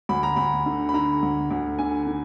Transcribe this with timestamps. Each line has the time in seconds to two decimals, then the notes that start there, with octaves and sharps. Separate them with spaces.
0.09 D2 B5
0.23 A#5
0.36 D2 B5
0.66 D3
0.89 B5
0.94 D3 A#5
1.23 D2
1.51 D2
1.79 D3 G#5
2.07 D3